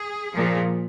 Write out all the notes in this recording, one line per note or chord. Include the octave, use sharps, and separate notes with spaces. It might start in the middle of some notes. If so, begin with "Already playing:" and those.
Already playing: G#4
A#2 F3